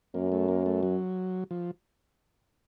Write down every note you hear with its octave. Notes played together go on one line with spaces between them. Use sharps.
F#2 A#3
A3
A#3
A3
F#3
F3